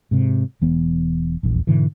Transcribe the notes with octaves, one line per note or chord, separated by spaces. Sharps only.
G#2 C3
E1 E3 B3
D#1 A#1 E2
G#2 B2 D3 E3